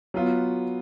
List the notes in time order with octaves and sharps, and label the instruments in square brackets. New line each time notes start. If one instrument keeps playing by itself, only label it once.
[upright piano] F#3 B3 F4